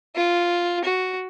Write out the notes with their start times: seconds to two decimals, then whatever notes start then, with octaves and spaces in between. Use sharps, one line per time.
0.16 F4
0.84 F#4